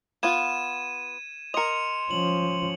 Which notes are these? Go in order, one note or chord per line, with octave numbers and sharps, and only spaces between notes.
B3 F4 G#6 D#7 E7
A#4 D#5 C6 C#7 F7
F3 C#4 F#7